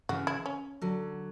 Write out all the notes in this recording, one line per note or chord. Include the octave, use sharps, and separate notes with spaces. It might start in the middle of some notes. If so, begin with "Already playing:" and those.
C#3 E3 F#4
E4
C#4
D3 F#3